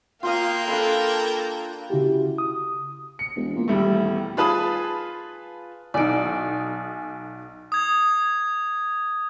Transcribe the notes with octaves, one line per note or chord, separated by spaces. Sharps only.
A#3 F4 A#4 F5 G5 D#6
D4 A4 F5 B5
C#3 E4 F#4 G4
D#6
C#7
E1
A#2
D#1 E2 G3 A3
F4 G#4 B4 A5 B5 D#6
B1 D#4 D5 G#5 D7
D#6 G#6